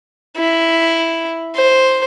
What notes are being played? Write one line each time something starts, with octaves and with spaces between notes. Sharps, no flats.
E4
C5